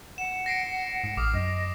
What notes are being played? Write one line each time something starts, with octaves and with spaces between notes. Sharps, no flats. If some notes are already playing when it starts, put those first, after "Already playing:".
F#5 E7
A#6 C7 D7
G#2
A1 D6 D#6 F6
F#2 D#5